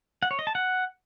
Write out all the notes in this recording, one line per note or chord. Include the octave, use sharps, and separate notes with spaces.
F#5
C#5
D#5
A5
F#5